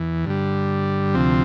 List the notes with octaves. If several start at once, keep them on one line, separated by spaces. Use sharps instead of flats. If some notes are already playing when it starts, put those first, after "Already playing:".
Already playing: E2 E3
G2 D3 G3
D2 C3 F3 C4